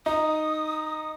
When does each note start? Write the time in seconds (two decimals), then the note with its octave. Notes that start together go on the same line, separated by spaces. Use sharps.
0.06 D#4 D#6